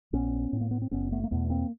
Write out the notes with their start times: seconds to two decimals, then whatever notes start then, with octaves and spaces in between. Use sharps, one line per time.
0.13 A#1 B3 C#4
0.53 A2
0.61 A#3
0.71 B3
0.82 C4
0.91 F#1 B3 C#4
1.12 A3 B3
1.23 A#3
1.31 E2 B2 A3 B3
1.50 A#3 C4